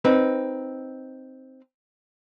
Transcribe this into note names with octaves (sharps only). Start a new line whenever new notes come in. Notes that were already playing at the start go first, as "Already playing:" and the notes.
C4 D#4 B4